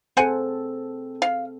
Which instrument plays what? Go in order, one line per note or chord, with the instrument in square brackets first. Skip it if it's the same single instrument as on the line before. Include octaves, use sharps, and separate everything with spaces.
[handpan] C4 G#4 A4 [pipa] C5 F#5 G#5
[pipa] F5